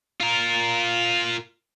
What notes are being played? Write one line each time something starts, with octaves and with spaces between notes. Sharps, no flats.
F4 A#4